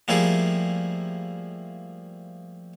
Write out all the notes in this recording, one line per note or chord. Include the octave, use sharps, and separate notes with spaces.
F3 G3 A3 A#3 E4 G#4